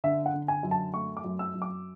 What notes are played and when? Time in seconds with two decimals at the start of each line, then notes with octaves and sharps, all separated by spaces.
0.04 D3 E5
0.26 F#5
0.34 D3
0.48 G#5
0.63 F#2
0.71 A5
0.94 A3 C#6
1.17 D6
1.24 F#2
1.39 E6
1.54 F#2
1.62 D6